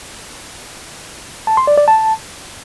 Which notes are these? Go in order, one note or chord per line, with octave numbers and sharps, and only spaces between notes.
A5
C6
D5
D5
A5